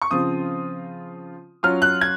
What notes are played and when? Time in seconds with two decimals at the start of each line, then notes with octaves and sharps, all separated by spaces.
0.02 C#6
0.11 C#3 F3 C4 F4 D#6
1.63 F#3 C#4 F4 F6
1.82 F#6
2.01 G#6